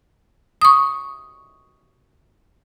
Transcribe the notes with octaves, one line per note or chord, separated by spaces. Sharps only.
C#6 D#6